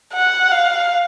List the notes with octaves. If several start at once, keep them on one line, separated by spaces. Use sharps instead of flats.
F#5
F5